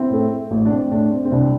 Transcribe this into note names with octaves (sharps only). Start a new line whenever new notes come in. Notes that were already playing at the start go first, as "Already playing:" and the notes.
Already playing: C4 E4
A2 A3
A1
D4
C4
A2 A3 D4
C4
C4
C2 D4